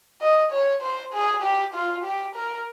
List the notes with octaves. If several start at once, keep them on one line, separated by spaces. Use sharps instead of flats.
D#5
C#5
C5
G#4
G4
F4
G4
A#4